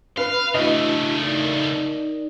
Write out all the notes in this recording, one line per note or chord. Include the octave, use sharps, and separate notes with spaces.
B4 F5
C#3 A3 D4 E4 F#4 D#5
D#4 A#4 D5